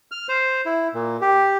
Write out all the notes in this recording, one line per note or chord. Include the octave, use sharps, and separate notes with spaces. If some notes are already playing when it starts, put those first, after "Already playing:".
F6
C5
E4
A#2
G4